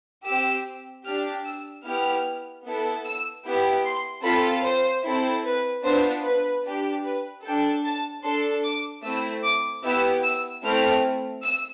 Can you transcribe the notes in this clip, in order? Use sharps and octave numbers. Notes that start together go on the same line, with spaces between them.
G4 E6
C4
D4 G4 F6
E6
B3 E4 G4 F6
B3 E4 A4
E6
B3 E4 G4
C6
C4 F4 A4 B5
C5
C4 E4 A4
B4
B3 D4 F4 C5
B4
D4 G4
B4
D4 A4 G5
A5
D4 A4 C6
D6
A3 C4 E4 E6
D6
B3 E4 G4 E6
E6
A3 C4 E4 F6
E6